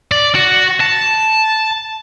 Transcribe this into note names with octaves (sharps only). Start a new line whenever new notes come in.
D5
F#4
A5